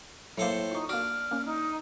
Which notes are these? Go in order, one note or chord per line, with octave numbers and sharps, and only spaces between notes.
A2 F#3 A#3 A4 C5
D#4 F4 C#6
A#3 D4 F#4 F6
A#3 C#4
D#4